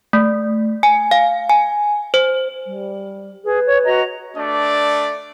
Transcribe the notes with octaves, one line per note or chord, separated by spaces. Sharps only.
A3
G#5
F5
G#5
C5
G3
G#4 B4
C#5
F#4 D#5 A#5
A3 D4 D5